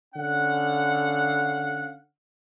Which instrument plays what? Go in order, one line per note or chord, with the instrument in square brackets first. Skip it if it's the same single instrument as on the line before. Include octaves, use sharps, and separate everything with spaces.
[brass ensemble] D3 C#4 F5 F#5